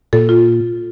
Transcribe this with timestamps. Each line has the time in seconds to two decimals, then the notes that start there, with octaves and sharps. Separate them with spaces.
0.13 A#2 A4
0.29 F4